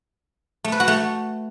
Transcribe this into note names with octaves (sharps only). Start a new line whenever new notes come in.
A3
B4
F#4
A3